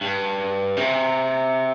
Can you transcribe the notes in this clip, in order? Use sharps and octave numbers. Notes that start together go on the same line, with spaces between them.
G2
C3